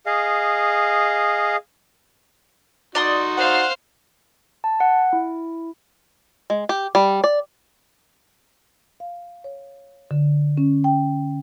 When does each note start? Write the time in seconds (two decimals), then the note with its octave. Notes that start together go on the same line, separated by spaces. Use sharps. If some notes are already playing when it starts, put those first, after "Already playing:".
0.06 G#4 D#5 F5
2.95 D#4 F#4 D5 C6 D#6
3.37 C5 F5 F#5
4.64 A5
4.80 F#5
5.13 E4
6.50 G#3
6.69 G4
6.95 G3
7.24 D5
9.00 F5
9.44 C#5
10.11 D3
10.57 C#4
10.84 G5